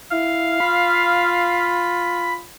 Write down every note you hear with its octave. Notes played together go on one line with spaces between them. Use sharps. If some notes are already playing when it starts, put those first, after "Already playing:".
E4 F5
F4 B5